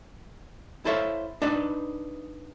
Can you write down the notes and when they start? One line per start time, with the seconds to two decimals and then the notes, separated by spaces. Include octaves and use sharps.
0.85 E4 A4 C5 C#5 E5 F5
1.42 D4 D#4 B4 C5